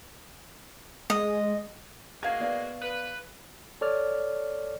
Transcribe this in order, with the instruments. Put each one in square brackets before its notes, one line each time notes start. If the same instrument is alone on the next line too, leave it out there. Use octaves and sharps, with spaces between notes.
[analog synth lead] G#3 [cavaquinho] D#5
[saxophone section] G#3 A#3 F#4 [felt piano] F5 G#6
[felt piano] B3 D5 F5
[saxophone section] B4
[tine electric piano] A4 C#5 D5 F6